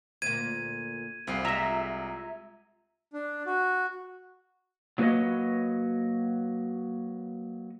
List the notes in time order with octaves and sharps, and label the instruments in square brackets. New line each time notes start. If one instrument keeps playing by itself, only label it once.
[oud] D2 A#2 [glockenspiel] G#6 D#7
[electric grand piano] C2 C7 [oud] F2 F3
[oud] G#3 F4 [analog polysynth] E5 A#5
[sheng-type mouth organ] D4
F#4
[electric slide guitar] F#3 A#3 F#4 B4 C#5 D#5